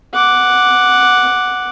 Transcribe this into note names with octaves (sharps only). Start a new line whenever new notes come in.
F#5 D6